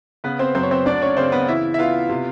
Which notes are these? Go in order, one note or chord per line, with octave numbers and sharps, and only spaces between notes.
C#3 B3 B4
C4 C5
F#2 C4 C5
C#5
C4 C5
D2 D4 D5
C#4 C#5
C#3 C4 C5
B3 B4
E3 E4 E5
E5
B3 F4 F5
C3